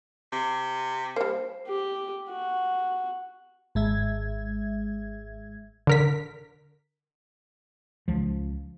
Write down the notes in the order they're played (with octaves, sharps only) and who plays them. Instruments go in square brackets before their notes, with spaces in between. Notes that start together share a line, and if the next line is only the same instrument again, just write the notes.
[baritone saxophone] C3
[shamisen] G3 A#3 [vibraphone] C5
[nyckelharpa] G4
F#4
[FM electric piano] G#1 G#3 E5 G#6
[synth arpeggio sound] D3 A#4 B6
[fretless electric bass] C#2 F3